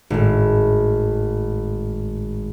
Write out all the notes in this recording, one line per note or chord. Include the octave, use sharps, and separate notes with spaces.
G#1 A2